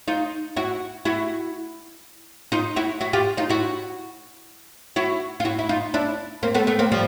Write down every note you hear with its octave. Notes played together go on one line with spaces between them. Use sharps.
D#4 F4
E4 F#4
E4 F#4
D#4 F4
E4 F#4
E4 F#4
F4 G4
D#4 F4
E4 F#4
E4 F#4
F4
E4 F#4
E4
D#4 F4
D4 E4
A#3 C4
A3 B3
A3 B3
A#3 C4
F3 G3